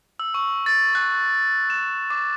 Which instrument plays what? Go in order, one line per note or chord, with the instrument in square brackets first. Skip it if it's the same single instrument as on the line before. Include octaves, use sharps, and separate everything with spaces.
[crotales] E6
C#6
A6
F#6
F#6
E7
D6